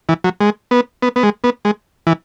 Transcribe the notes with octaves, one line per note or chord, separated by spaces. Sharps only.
E3
F#3
G#3
B3
B3
B3
G#3
B3
G#3
E3